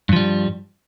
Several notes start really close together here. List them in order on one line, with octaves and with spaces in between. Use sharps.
G2 F3 G3